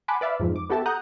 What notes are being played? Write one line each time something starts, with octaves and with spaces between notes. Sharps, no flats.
F#5 G#5 A5 B5 C6 D6
B4 D5 E5 F5 B5
F2 G#2 F3
D6
B3 F#4 G4 A4 E5 A5
F#5 A#5 D#6 F#6 G6